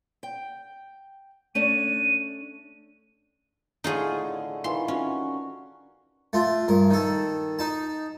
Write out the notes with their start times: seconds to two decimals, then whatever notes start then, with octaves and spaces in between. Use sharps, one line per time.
0.23 G5
1.55 A3 C#4 D4 D#7
3.84 A2 D3 D#4 F4 G#4 C#6
4.64 D#3 E3 F4 C6
4.88 C#4 F#4
6.33 A3 F4
6.68 G2 A#4
6.90 D#3 A4
7.59 D#4 A5